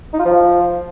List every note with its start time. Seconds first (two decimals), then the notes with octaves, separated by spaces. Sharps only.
0.13 D#4
0.19 F4
0.25 F3